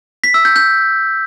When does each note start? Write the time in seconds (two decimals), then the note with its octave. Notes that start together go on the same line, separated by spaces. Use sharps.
0.24 B6
0.34 E6
0.45 G6
0.56 G6